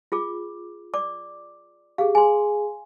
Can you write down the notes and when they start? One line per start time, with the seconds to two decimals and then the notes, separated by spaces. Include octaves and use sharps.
0.12 F4 G#4 D6
0.94 D5 D6
1.98 G4 G#4 F5
2.15 G#4 G#5 C6